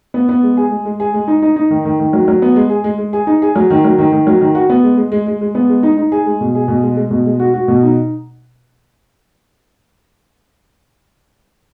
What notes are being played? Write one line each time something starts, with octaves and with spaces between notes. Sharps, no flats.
B3
B3
G#3
G#4
G#3
G#3
G#4
G#3
D#4
D#4
D#4
D#3
D#3
D#3
F#3
F#3
B3
G#3
G#4
G#3
G#3
G#4
D#4
G#4
F#3
D#3
F#3
D#3
D#3
F#3
D#3
F#4
B3
G#3
G#3
G#3
G#3
G#3
B3
G#3
D#4
D#4
G#4
G#3
B2
G#4
B2
G#3
G#3
B2
G#3
F#4
F#4
B2
D#4